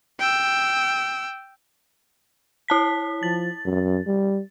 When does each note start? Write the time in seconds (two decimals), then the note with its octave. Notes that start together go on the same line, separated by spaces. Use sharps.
0.19 G5 E6
2.68 E4 A5 B6
3.23 F3 A6
3.65 F#2
4.07 G3